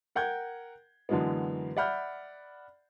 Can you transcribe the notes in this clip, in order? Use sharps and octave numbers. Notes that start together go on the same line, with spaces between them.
A#4 F#5 G5 G6 G#6
F#2 D3 E3 F#3 G#3 B3
D5 E5 F#5 B5 F6 G6